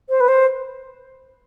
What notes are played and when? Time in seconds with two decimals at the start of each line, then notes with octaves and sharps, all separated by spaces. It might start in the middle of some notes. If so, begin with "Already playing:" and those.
0.10 C5
0.20 B4
0.28 C5